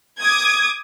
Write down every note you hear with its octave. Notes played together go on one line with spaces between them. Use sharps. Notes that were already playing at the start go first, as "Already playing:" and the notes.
D6 D#6 G#6